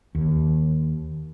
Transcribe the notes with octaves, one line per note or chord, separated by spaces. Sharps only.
D#2